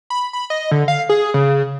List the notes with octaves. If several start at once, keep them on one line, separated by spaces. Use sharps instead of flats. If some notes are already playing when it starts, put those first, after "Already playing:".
B5
B5
D#5
D3
F5
G#4
C#3